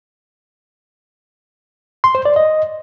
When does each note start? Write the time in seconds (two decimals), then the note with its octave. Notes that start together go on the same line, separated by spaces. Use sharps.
2.04 C6
2.15 C5
2.25 D5
2.36 D#5